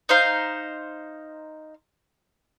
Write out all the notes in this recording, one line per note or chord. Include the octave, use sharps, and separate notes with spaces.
D#4 C5 F5